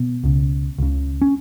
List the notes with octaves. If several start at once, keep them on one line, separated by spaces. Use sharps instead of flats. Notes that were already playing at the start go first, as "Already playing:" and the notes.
Already playing: B2 B3
C#2 C#3
C#2 C#3
C#4